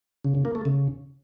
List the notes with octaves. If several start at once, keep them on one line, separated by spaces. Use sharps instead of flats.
C#3
C#3
A#3
A3
C#3